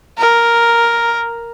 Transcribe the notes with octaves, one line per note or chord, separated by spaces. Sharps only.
A#4